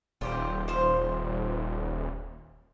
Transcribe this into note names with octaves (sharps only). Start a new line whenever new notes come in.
D#1 F4 G4 C5
F3 C5 F5